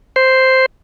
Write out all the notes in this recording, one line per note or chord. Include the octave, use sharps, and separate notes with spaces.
C5